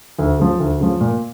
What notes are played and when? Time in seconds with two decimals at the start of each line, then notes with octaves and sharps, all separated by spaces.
0.19 D2
0.39 C#3 F3
0.60 D2
0.81 C#3 F3
1.01 A#2